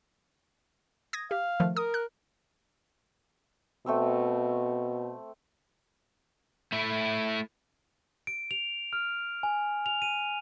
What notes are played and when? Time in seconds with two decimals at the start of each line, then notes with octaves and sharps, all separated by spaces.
1.13 D#6 G#6 A#6
1.31 G4 F5
1.60 D#3 F3 A3
1.77 A#4 D#6
1.94 F#6
3.86 B2 A3 C4 E6
6.72 A3 E4
8.27 D7
8.51 F7
8.93 F6
9.43 G#5
9.86 F7
10.02 D#7